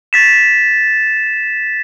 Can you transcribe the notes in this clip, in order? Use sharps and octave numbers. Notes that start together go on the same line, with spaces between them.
A6 B6 E7